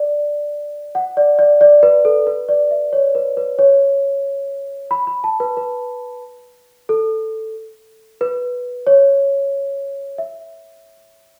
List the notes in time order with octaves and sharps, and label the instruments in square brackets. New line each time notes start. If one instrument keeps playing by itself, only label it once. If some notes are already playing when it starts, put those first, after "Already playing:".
Already playing: [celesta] D5
F#5
D5
D5
D5
B4
A4
B4
D5
E5
C#5
B4
B4
C#5
B5
B5
A5
B4
B4
A4
B4
C#5
E5